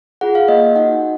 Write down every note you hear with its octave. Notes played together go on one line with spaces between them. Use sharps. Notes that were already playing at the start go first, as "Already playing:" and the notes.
F4 G#4 F#5
F5
A#3 D#5
D#4 F#4 F#5